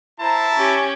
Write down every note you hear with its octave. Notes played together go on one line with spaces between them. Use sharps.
E4 C5 A5 A#5
C#4 G4